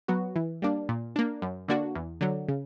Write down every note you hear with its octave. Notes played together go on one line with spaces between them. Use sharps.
F#3 B3 F#4
E3
G3 A#3 D4
A#2
A#3 D4
F#2
D3 A#3 D4 F#4
E2
D3 F#3
C#3